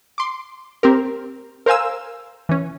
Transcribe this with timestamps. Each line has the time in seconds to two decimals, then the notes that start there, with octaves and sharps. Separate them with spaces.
0.18 C6 D6
0.83 C4 G4 A#4
1.66 A#4 C5 F5 G#5 E6
2.49 E3 C#4